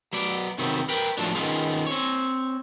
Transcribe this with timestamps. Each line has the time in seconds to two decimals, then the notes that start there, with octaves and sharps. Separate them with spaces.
0.13 F#3 B3 D5
0.58 C3 D#3 F#3 B3 C4
0.89 A#4 B4 G5
1.17 A2 F3 F#3 D4
1.35 D#3 G3 B3 C#4 F4 G#4
1.87 C4 C#5